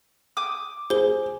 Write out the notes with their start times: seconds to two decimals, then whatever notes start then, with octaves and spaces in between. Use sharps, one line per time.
0.37 D6 D#6
0.90 G#4 C5 G7